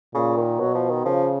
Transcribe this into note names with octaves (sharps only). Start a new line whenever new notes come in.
A#2 C#3
D#3
B2 F#3
F3
D#3
C#3 F3